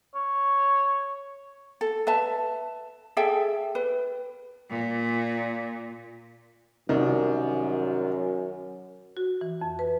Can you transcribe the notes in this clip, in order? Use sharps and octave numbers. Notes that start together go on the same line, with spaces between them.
C#5
A4
B4 E5 A5
G#4 A4 E5 G5
B4
A#2
C2 F#2 D#3
F#4
E3
F2
B4